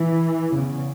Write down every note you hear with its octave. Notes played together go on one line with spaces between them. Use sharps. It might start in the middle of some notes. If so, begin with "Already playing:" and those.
Already playing: E3
E2 C#3